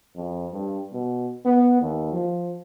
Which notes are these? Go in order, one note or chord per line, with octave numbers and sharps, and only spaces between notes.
F2
G2
B2
B3
D#2
F3